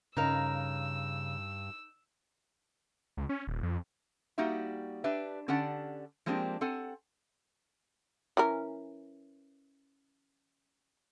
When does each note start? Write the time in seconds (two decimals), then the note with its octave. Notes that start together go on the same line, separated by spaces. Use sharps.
0.17 G2 C#3 D#4 A#4 F5 E6
3.17 C#2
3.29 C#4
3.47 D#1
3.63 F2
4.38 G3 A#3 D#4 F#4 G4 E5
5.04 D4 G4 B4 E5
5.48 D3 C#4 G4 D5 F#5 A5
6.26 F3 G#3 A#3 C4 D4 G4
6.61 C4 A4 F#5 G#5
8.37 E3 C#4 A#4